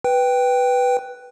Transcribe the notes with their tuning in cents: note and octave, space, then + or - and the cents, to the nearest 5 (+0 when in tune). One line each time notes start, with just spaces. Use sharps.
B4 +0 G5 +0